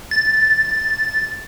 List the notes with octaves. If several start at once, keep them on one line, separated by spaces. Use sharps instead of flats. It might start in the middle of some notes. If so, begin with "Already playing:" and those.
A6